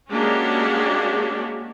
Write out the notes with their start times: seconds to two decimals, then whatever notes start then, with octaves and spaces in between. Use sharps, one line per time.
0.11 G#3 A#3 C#4 D4 F#4 G4